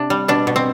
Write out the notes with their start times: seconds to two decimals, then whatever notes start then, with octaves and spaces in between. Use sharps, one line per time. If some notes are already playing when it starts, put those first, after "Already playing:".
Already playing: C3 D4
0.10 G3
0.28 B2 D4
0.47 B2
0.56 C4